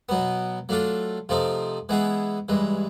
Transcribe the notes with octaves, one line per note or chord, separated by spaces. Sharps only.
B2 F#3 B3
F#3 A3 D4 F4 A4
C3 F3 A3 C4 D#4
E3 G#3 B3 E4 G#4
G2 E3 G#3